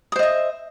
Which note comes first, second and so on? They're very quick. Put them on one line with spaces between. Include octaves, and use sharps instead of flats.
D#6 C5 D#5 E5